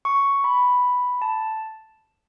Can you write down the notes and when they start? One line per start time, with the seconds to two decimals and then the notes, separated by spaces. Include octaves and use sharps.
0.05 C#6
0.44 B5
1.22 A5